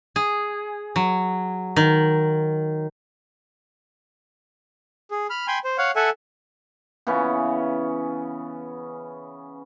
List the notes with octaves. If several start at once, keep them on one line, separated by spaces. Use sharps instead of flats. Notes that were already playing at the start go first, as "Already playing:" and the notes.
G#4
F#3
D#3
G#4
B5 F6
G5 G#5 B5 C6
C5
C#5 F5 F#5
A4 E5 F#5 G#5
C#3 E3 B3 C#4